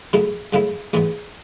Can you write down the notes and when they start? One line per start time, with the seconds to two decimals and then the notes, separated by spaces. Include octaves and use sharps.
0.13 F#2 C#3 F#3 A3 E4
0.53 F#2 C#3 F#3 A3 E4
0.93 A1 G#2 E3 B3